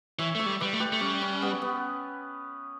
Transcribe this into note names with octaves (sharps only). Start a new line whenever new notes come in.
E3 C#5 E5
A3 C#5 E5
G3
G3 B4 D5
A3
G4 B4
A3
G3 C#4
C#4
B3
B3